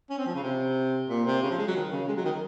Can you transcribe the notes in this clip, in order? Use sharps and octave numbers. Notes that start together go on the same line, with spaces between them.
C#4
C4
F3
C#3
C3
A#2
C3
C#3
F3
G#3
F#3
D#3
C#3
G#3
F#3
D#3